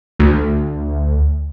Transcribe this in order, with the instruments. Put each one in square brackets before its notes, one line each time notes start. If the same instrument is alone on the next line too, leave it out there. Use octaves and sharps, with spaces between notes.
[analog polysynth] D2